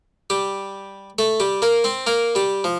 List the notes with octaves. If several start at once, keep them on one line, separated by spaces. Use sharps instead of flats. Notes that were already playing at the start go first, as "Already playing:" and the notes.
G3 G4
A3 A4
G3 G4
A#3 A#4
C4 C5
A#3 A#4
G3 G4
F3